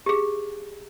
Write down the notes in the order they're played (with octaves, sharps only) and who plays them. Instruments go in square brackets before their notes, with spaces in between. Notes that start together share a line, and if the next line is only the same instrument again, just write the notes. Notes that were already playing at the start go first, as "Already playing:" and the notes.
[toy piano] G4 G#4